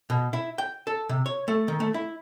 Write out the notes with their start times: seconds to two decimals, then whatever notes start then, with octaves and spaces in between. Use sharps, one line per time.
0.10 B2
0.33 E4
0.58 G5
0.87 A4
1.09 C3
1.26 C#5
1.48 A3
1.68 D#3
1.80 A3
1.94 E4